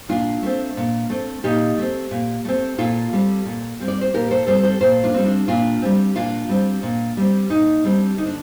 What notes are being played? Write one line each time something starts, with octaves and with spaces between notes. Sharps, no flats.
A#2 D4 F4
A3 C4
A#2
A3 C4
A#2 D#4 G4
A3 C4
A#2
A3 C4
A#2 F4 A4
G3 C4
A#2
G3 C4
D5
C5
A#2 G4 A#4
A4 C5
G3 C4 A4 C5
A4 C5
A#2 A4 C5
D4 F4
G3 C4
D4
A#2 D4 F4
G3 C4
A#2 D4 F4
G3 C4
A#2
G3 C4
A#2 D#4
G3 C4 D4
D3 D#4
D4